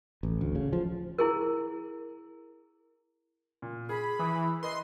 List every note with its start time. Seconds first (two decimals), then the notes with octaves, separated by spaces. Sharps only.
0.23 A1
0.41 D2
0.55 C#3
0.73 F3
1.18 E4 G#4 A#4
3.62 A#2
3.89 G#4 B5
4.19 E3 D#6
4.63 B4 D#5 C6